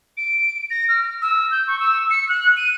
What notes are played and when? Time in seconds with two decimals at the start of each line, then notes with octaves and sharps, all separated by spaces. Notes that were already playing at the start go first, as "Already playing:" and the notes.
0.17 D7
0.70 A#6
0.89 F6
1.22 E6
1.52 G6
1.67 C#6
1.79 E6
2.10 C#7
2.29 F#6
2.57 D#7